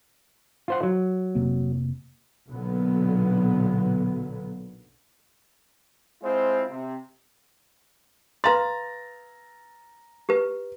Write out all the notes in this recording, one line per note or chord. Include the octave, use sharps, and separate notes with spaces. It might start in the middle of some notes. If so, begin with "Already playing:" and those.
F4 C5 F#5
F#3
F1 C3 A#3
B1 A#2 D3 F#3 B3
G#3 C4 E4 F4 C5
C3
B4 F5 A#5 C6 A6
G4 B4